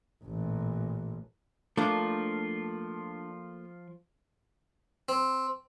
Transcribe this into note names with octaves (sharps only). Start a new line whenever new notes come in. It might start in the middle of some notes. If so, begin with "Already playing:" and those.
A1 A#2
F3 A3 A#3 D4 F4
C4